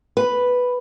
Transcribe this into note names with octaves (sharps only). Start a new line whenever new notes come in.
B4